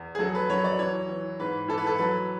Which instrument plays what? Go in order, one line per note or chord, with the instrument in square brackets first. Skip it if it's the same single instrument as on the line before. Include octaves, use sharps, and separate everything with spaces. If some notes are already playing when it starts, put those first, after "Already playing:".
Already playing: [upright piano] E2
G#4
F#3 A4
B4
F#3 C#5
D5
E3 C#5
E3
G#2 B4
E3 A4
B4
A4
F#3 B4